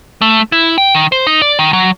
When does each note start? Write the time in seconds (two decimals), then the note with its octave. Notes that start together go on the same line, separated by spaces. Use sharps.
0.22 A3
0.52 E4
0.78 G5
0.95 D#3
1.12 C5
1.27 D#4
1.42 D5
1.59 D#3
1.73 F#3